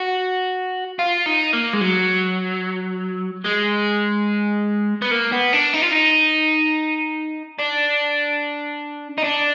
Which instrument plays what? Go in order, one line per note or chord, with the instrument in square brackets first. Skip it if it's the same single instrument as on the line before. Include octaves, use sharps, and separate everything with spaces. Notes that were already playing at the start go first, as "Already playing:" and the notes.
Already playing: [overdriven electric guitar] F#4
F4
D#4
A#3
G#3
F#3
G#3
B3
A#3
B3
D4
D#4
F4
D#4
D4
D#4
D4